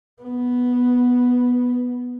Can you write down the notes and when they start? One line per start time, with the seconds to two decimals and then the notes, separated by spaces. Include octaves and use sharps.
0.23 B3